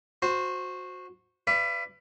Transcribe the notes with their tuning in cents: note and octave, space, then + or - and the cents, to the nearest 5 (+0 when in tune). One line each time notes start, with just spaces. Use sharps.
F#4 -20 C5 +0
B4 +15 D5 +0 F5 -45